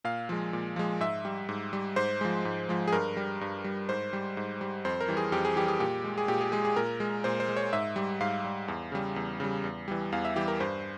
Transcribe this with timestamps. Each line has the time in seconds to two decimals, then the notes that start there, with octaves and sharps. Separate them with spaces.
0.04 A#2 F5
0.29 F3 G#3
0.53 A#2
0.76 F3 G#3
1.00 G#2 E5
1.25 G3
1.49 G#2
1.73 G3
1.96 G#2 C5
2.21 F3 G#3
2.45 G#2
2.69 F3 G#3
2.88 G#4
2.92 G2 A#4
3.17 G3
3.41 G2
3.64 G3
3.89 G#2 C5
4.13 G3
4.37 G#2
4.61 G3
4.85 F2 C5
5.01 A#4
5.08 E3 G3
5.17 G#4
5.32 F2 G4
5.45 G#4
5.56 E3 G3 G4
5.68 G#4
5.80 A#2 G4
6.04 G#3
6.18 G#4
6.28 A#2 G4
6.41 G#4
6.52 G#3 G#4
6.65 G#4
6.76 A#2 A#4
7.00 G#3
7.24 A#2 C5
7.40 C5
7.49 G#3
7.57 C#5
7.73 G#2 E5
7.96 G3
8.20 G#2 F5
8.44 G3
8.68 E2
8.92 C#3 G3
9.16 E2
9.40 C#3 G3
9.64 E2
9.88 E3 G3
10.12 E2 F5
10.25 E5
10.36 E3 G3 G4
10.48 A#4
10.60 G2 C5